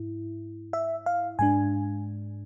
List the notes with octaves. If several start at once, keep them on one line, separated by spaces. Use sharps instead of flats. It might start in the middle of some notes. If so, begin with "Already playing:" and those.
Already playing: G#2 E4
E5
F5
G#2 G#3 D4 G#5